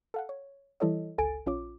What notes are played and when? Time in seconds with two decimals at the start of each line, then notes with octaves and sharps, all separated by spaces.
0.14 A4 F5 F#5
0.29 C#5
0.80 E3 G3 E4 A4 C#5 D#5
1.18 G1 C#2 A4 G#5 A6 D7
1.46 A#1 C#4 F4 C#5 D6